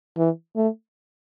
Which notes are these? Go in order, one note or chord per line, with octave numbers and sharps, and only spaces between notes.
E3
A3